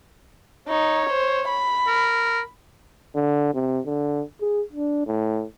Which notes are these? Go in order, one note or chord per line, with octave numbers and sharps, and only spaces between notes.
D#4 C#5
C5
B5
A#4
D3
C3
D3
G#4
D4
A2